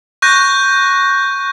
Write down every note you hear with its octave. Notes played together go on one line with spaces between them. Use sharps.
C#6 F#6 G6 A#6